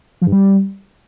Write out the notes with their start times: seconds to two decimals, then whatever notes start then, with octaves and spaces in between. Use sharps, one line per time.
0.21 F3
0.27 G2
0.32 G3